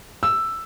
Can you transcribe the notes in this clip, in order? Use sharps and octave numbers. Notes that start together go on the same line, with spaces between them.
E6